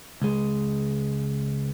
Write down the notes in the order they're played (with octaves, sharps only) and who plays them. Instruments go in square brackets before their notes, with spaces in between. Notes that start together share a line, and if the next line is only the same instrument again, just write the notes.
[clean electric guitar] C#2 G#3